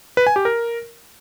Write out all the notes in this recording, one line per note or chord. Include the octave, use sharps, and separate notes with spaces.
B4
G#5
G4
A#4